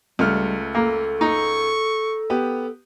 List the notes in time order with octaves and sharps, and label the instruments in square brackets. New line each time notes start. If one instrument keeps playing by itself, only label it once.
[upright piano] C#2 A3 F6 [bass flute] G3
[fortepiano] A#3 [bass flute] A4
[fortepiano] D#4 [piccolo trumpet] C#6
[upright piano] B3 G4